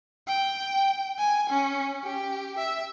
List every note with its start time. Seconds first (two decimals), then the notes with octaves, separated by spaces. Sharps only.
0.28 G5
1.18 G#5
1.49 C#4
2.04 G4
2.58 E5